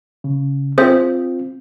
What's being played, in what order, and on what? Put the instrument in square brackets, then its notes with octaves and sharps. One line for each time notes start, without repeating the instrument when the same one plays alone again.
[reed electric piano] C#3
[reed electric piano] C4 F4 [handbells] G#4 C5 E5